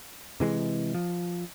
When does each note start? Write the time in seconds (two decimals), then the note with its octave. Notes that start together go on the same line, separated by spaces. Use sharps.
0.40 C3 E3 G#3
0.94 F3